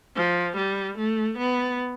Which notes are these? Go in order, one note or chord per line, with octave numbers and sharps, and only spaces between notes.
F3
G3
A3
B3